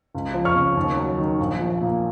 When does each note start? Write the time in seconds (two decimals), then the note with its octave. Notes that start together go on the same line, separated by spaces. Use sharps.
0.14 C#2
0.34 F3
0.45 C#6 F6
0.55 C#3
0.77 D#2
0.97 F#3
1.18 D#3
1.40 A#1
1.59 F3
1.81 A#2